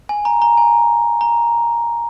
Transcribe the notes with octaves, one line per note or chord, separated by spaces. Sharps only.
G#5
A#5
A#5
G#5
A#5